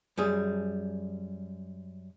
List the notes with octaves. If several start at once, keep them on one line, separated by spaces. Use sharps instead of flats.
F#2 G3 G#4